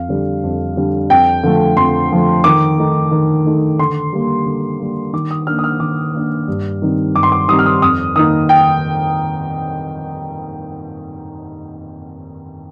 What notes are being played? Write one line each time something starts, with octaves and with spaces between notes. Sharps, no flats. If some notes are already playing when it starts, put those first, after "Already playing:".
Already playing: F2 F5
D3 G3 D4
F2
D3 G3 D4
F2 G5
D3 F3 A3
F2 C6
D3 F3 A3
D#3 D6
A3 D#4
D#3
A3 D#4
D3 C6
G3 A#3
D3
G3 A#3
D#3 D6
D#6
A#3 D4 F6
D#6
F6
D#3 D6
A#3 D4
G2
D#3 G3 C4 D#4
G2 D6
C6
D6
D#3 G3 C4 D#4 D#6
F6
D#6
F2 D#6
D#3 A#3 D#4 D#6
G5